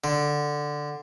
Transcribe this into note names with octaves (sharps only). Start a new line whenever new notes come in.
D3